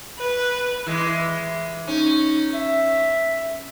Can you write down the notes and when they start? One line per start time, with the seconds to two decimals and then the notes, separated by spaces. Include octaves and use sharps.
0.19 B4
0.86 E3 G#3
1.87 C#4 D#4
2.54 E5